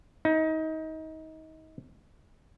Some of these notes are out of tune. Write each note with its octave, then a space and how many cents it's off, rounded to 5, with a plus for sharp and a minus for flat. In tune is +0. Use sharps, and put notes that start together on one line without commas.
D#4 +30